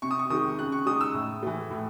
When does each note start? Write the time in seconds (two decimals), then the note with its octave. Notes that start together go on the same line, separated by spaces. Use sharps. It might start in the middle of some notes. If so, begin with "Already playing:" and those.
0.02 C3 C#6
0.11 D#6
0.19 C#6
0.30 D#3 G#3 D#6
0.59 C#3 F#6
0.72 C#6
0.86 G#3 D#4 D#6
1.01 E6
1.14 A2
1.43 E3 A3
1.70 A2